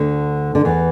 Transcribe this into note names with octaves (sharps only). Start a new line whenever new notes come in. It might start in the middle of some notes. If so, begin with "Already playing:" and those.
Already playing: D2 D3
D3
E2 E3